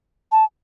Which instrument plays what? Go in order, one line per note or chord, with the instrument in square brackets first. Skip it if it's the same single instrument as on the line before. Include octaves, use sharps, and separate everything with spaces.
[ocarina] A5